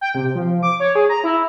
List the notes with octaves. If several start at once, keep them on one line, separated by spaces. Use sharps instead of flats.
G5
C3
F3
D6
C#5
G#4
A#5
E4